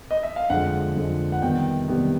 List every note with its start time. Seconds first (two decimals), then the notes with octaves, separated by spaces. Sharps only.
0.11 D#5
0.23 E5
0.36 F5
0.50 F2 D3 F3 G#3 F#5
0.96 F2 D3 F3 G#3
1.32 F#5
1.42 C3 D#3 G3 B3 G5
1.88 C3 D#3 G3 B3